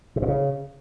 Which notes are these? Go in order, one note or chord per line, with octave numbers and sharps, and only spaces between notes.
C3
A#2
C#3